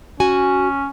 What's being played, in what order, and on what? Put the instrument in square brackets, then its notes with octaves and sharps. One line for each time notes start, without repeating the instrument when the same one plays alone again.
[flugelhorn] C#4 [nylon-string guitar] F#4 G#5